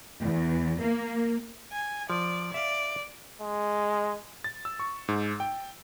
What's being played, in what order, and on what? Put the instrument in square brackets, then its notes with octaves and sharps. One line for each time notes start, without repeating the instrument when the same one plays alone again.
[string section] E2
A#3
[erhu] G#5
[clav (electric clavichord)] F3 [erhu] D5
[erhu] D5 [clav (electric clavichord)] E5 F5
[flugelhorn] G#3
[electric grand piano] A6
E6
C#6
G#2
G5